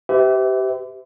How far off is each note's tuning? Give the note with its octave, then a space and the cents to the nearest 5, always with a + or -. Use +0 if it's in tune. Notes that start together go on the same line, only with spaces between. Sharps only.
G4 -20 B4 +45 E5 -20